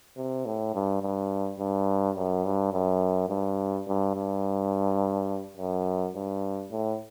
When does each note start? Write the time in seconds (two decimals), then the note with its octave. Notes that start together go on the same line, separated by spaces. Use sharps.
0.17 C3
0.46 A2
0.74 G2
1.02 G2
1.59 G2
2.16 F#2
2.45 G2
2.73 F#2
3.29 G2
3.87 G2
4.15 G2
5.57 F#2
6.15 G2
6.71 A2